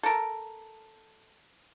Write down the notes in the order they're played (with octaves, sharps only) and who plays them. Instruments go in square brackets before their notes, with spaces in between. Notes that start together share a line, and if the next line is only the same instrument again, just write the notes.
[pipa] A4 A#4